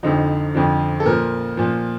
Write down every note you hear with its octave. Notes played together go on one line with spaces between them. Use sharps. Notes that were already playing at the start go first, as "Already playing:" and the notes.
F2 D3 F3 D#4
F2 D3 F3
A4
A#2 F3 A#4
A#2 F3